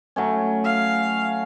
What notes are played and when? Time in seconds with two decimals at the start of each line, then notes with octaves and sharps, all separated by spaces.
0.16 F#3 A3 C#4
0.64 F5